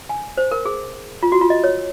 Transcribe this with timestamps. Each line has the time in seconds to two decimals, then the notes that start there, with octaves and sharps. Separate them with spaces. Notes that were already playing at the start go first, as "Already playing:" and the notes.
0.09 G#5
0.38 C5
0.51 A#4
0.65 G#4
1.23 F4
1.32 F#4
1.41 F4
1.50 D#5
1.64 C#5